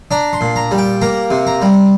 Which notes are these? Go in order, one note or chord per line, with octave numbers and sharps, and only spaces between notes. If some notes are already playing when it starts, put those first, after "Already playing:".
D4 A#5
C6
A#2
A#5
G3
G5
A#3 A#5
C3
A#5
G3